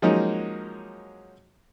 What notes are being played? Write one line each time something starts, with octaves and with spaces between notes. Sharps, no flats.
F3 F#3 G#3 A#3 C#4 D#4